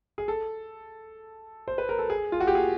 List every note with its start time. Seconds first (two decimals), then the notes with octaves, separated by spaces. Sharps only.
0.18 G#4
0.28 A4
1.68 C5
1.78 B4
1.89 A#4
1.99 A4
2.10 G#4
2.32 F4
2.40 F#4
2.47 G4
2.55 G#4